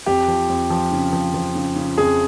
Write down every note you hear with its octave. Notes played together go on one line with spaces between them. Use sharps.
F2 G4
F3
F2
F3
C#3
F3
F3
C#3
C#3
F2 G#4